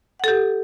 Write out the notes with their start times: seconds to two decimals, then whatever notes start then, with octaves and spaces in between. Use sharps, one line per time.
0.19 F#5
0.24 A4
0.28 G4